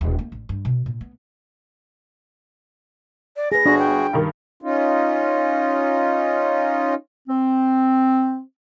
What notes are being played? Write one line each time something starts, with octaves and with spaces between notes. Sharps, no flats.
D#1
A#3
A1
G2
B2
A#2
B3
D5
G#4 B4 A#6
G1 D4 F#4 G#4
G5
G2 D#3
C#4 D#4 F4
C4